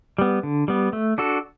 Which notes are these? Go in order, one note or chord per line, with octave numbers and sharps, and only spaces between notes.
G3 B3
D3
G3 B3
A3
D4 F#4 A4